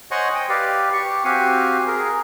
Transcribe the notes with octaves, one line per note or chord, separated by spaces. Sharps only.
C5 C#5 D#5 F#5 G#5 C#6
D#5 G5
G4 B4 D5 F5
G4 C#6
C4 F#4 G4 F5 G#5
G#4 A#4